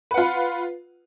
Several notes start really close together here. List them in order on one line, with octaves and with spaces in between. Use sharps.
B4 F#5 F4